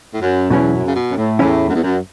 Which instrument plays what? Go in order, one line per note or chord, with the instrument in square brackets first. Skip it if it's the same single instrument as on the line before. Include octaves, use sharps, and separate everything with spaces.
[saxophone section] A2
F#2
[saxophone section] E2 [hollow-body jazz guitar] B2 F#3 C#4 E4
[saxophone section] F#2
C#3
B2
F#2
A2
[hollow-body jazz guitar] E2 E3 A3 C#4 E4 [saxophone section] A2
[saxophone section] F#2
E2
F#2